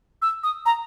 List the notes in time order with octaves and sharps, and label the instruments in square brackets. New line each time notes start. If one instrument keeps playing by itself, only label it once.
[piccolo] E6
D#6
A#5